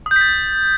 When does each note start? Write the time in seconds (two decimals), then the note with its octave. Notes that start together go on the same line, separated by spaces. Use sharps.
0.06 D#6
0.11 G6
0.16 B6
0.21 A6